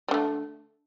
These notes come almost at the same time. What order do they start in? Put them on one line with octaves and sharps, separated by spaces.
G3 D3 A3